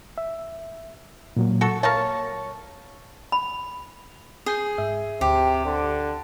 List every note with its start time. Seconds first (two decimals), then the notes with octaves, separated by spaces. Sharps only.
0.18 E5
1.37 A#2 F#3 A#3
1.61 F#4 A4
1.83 A#4 C#5 F5 A5 C#6
3.32 B5
4.46 G#4 D#6 G6 C7
4.78 G#2 E5
5.21 D2 C3 G4
5.66 D3